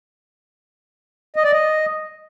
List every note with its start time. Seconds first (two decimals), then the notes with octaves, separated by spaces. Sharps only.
1.36 D#5
1.44 D5
1.52 D#5